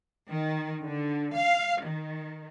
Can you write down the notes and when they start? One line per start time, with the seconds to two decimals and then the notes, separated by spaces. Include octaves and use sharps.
0.29 D#3
0.84 D3
1.36 F5
1.84 D#3